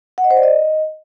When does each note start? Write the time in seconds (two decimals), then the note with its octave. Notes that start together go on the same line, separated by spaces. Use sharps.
0.18 F#5
0.24 D#5
0.31 C5
0.37 D5
0.43 D#5